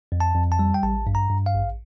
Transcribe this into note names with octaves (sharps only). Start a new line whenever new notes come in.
F2
A5
F2
A5
G3
G5
A1 A5
G2
A#5
G2
F5
A1